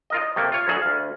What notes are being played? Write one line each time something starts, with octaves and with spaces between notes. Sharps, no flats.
F4 A#4 D#5
D#5
C3 A3 A#3
F4 C#5
D2 F#3 G#4 A4
D2 F5